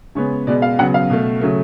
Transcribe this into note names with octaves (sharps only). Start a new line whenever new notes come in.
C#3 G#3 B3 C#5
B2 G#3 B3 D5
F5
C#3 F#3 B3 F#5
F5
B2 A3
C#3 F#3 A3